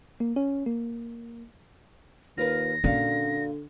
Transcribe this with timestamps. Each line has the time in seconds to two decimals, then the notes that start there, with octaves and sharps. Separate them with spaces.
0.20 A#3
0.36 C#4
0.66 A#3
2.38 D#2 F4 A#4 B4 A#6
2.84 A#2 D3 C#4 F#4 F5